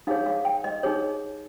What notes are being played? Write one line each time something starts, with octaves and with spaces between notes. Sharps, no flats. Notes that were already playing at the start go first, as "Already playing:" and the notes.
D#4 G#4 C#5 F5
F5
G5
D#5
D#4 G#4 C#5